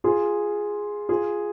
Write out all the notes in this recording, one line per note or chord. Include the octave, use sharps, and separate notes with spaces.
F4 G#4
F4 G#4